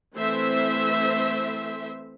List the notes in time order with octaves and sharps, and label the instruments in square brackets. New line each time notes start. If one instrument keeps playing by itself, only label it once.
[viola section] E3 A3 C4 C5 E5